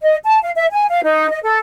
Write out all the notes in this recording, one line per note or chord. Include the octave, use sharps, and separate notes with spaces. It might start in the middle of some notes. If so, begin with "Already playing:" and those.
D#5
A5
F5
E5
G#5
F5
D#4
D#5
A4